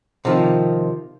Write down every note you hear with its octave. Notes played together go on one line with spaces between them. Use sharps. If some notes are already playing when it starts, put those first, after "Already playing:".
C3 D#3 F3